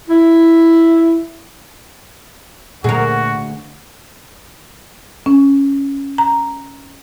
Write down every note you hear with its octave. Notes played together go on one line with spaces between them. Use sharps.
E4
D2 A#2 F#4 G#4 A#4
C#4
A#5